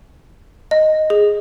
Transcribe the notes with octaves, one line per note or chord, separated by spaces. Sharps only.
D#5
G#4